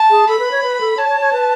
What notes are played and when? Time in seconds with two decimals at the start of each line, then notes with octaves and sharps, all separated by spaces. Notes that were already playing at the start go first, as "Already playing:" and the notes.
Already playing: A5
0.10 G#4
0.28 A4 B5
0.39 B4
0.51 C#5
0.63 B4
0.81 A4
0.97 C#5 A5
1.09 C#5
1.21 C#5
1.32 B4